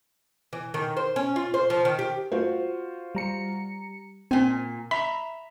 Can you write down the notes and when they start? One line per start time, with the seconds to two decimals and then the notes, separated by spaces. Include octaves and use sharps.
0.53 E3
0.74 D#3
0.97 C5
1.16 C#4
1.36 F4
1.54 C5
1.70 F3
1.85 D#3
1.99 G4
2.32 F4 F#4 C5
3.15 G3 A#5 C#7
4.31 A#2 C4 G#5
4.91 E5 A#5 B5